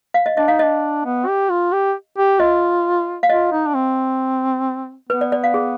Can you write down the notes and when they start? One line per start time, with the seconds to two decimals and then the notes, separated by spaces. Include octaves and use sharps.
0.14 F5
0.26 D#5
0.37 D4 D#5
0.48 D#4 F5
0.59 D4 D#5
1.05 B3
1.27 G4
1.50 F4
1.72 G4
2.17 G4
2.39 F4 D#5
3.23 F5
3.30 F4 D#5
3.52 D#4
3.67 D4
3.74 C4
5.09 B3 B4
5.21 D5
5.32 D5
5.44 F5
5.54 G#4